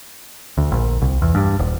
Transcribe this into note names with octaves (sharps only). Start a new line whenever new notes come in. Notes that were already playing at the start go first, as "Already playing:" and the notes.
D2
A#1
C2
E2
G2
D#1